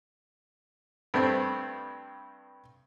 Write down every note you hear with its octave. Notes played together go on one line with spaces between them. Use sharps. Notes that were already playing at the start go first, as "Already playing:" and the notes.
G2 A3 C4